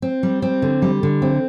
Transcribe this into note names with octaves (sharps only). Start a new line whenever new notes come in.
C4
G3
C4
D3
G3
D3
C4